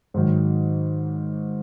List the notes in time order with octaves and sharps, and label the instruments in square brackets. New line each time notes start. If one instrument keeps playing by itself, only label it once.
[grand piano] G#2 D#3 F#3